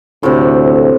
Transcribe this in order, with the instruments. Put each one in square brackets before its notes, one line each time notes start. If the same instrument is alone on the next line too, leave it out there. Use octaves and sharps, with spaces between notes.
[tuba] D2 [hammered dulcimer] A2 C3